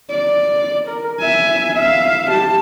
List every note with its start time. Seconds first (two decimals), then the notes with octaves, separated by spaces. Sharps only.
0.10 D5
0.88 A#4
1.19 E5 G#5
1.76 E5 F5
2.31 G4 A5